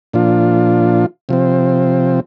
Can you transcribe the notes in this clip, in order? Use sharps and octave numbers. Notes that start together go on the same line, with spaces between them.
A#2 F3 D4 F4
C3 F3 C4